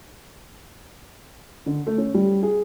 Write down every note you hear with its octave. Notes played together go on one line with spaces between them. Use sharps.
D3
A3
C#4
G3
G#4